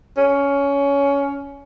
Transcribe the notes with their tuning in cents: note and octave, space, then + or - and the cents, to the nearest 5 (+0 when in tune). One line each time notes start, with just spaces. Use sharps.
C#4 +15